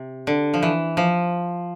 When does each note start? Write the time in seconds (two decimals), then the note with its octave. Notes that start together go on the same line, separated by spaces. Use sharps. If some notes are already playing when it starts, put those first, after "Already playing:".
Already playing: C3
0.27 D3
0.54 F3
0.63 E3
0.97 F3